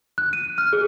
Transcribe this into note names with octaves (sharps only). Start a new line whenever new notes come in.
F#6
D#7
F6
G#4